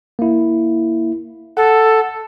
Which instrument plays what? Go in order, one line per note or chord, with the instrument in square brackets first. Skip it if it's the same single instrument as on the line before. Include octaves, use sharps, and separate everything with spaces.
[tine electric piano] A#3 E4
[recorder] A4 [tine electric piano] F#5